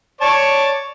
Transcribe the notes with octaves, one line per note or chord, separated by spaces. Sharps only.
C#5 D5 A5